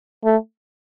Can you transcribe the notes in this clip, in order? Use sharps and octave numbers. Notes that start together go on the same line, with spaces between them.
A3